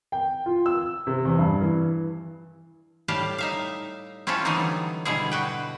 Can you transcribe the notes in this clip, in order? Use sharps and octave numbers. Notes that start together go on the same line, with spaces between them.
G5
F4
E6
C3
E2
G2
E3
A2 G3 G4 F5 A5
D#4 E5 F5
C4 C#4 E4 F4 A4
D3 E3 F#3 G3 B3 D#4
B2 D3 G3 E4 G#4
F#4 B4 G5